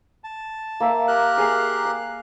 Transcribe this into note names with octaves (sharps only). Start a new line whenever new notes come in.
A5
A#3 E5
G4 A#4 F#6
G#4 F5
F5